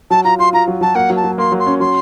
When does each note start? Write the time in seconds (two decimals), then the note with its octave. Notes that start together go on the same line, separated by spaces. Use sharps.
0.11 F#3 A5
0.24 F4 A#5
0.39 F4 C6
0.53 F4 A#5
0.68 F#3
0.81 F#3 A5
0.95 A#3 F#5
1.10 F#3
1.16 A5
1.24 F#3
1.38 A#3 C6
1.52 F#3
1.60 C6
1.66 C#4
1.80 F#3 C6